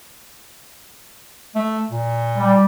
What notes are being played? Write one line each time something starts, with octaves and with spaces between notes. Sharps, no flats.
A3
A#2
G3